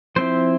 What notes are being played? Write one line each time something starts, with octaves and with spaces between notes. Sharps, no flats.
F3 C4 E4 C5